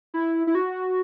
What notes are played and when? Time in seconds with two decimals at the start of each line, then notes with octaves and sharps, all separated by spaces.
0.14 E4
0.47 E4
0.55 F#4